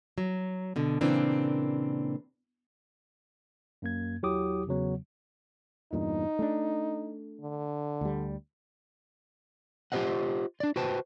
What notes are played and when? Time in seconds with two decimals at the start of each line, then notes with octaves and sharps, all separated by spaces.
0.18 F#3
0.76 B2 D3
1.01 A#2 C#3 E3 A#3 C4 D4
3.82 F#2 A#3 G#6
4.23 D#2 F#3 E4 G4 D6 D#6
4.67 E2 C#3 F#3 B3
5.93 E2 G2 A#2 D#4
6.39 A3 D4
7.41 D3
8.01 D2 G3
9.92 F4 G4 G#4 C5 D#5 F#5
10.60 D4 D5
10.76 F#4 B4 C5 G5 A5